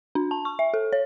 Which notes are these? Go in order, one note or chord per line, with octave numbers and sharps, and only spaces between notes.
D4
A5
C#6
E5
A4
C#5